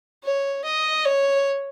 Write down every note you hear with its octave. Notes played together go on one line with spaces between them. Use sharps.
C#5
D#5
C#5